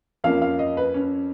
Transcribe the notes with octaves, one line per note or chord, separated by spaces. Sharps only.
F2 F3 A#3 C#4 F5
F5
D#5
B4
C#4